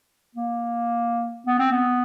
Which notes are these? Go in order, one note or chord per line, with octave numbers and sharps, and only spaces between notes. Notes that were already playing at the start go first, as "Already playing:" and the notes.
A#3
B3
C4
B3